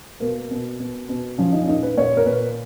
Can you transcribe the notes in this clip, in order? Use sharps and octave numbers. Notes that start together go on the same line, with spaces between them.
B2 A#3
B2
B2
B2
F3 C#4
D#4
C#4
A#2 D#4
B4
A#2 C#5
A#4
A#2 B4